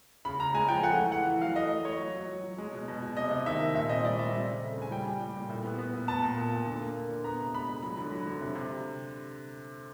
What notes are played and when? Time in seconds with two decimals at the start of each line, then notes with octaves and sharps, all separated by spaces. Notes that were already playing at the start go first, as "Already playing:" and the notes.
0.25 C#3 B5
0.40 C#3 A#5
0.54 G#3 G#5
0.69 F3 G5
0.83 A3 F#5
0.98 E3
1.12 E3 F#5
1.27 E3
1.41 F#3 F5
1.56 A3 D#5
1.71 A3
1.85 A3 C#5
2.00 F#3
2.14 F#3
2.30 F#3
2.44 F#3
2.58 G#3
2.72 B2
2.88 B2
3.02 B2
3.16 C3 D#5
3.31 C3
3.46 D#3 E5
3.60 D#3
3.74 A#2 E5
3.89 C4 D#5
4.04 G3 D5
4.18 G3 E5
4.34 C4
4.48 C#3
4.63 A3
4.77 C#3 G#5
4.91 G3 G5
5.07 G3
5.20 G3
5.35 A#2
5.50 A2
5.65 B3
5.78 B3
5.93 B3
6.08 B3 A5
6.22 A#2
6.38 A#2
6.52 A#2
6.66 D3
6.81 A#3
6.96 A#3
7.10 D3
7.24 B3 A#5
7.39 C3
7.54 G#3 B5
7.68 G#3
7.83 F#3 B5
7.97 D3
8.12 F#3
8.27 D3
8.41 C3
8.55 C3